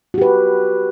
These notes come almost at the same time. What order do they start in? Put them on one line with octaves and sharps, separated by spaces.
F#4 G4 B4